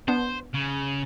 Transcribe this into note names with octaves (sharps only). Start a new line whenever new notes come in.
B3 D4 C5
C#3